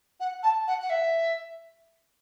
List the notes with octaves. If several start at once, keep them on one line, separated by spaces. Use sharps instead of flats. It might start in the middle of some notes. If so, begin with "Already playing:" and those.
F#5
A5
F#5
F#5
E5